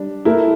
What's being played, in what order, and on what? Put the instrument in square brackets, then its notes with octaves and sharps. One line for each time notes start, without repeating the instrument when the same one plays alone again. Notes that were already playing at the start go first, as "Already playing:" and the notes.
Already playing: [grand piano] G3 D4
A3 E4 A#4